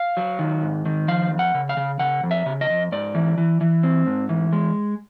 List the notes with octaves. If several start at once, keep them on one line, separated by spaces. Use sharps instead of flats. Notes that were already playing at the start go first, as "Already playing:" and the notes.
Already playing: F5
F#3
D#3
G#2
D#3
F3 F5
F2
F#5
C#3
F5
C#3
C#3 F#5
F2
E5
C#3
D#5
F2
G#2 D5
E3
E3
E3
C4
G#2
E3
G#3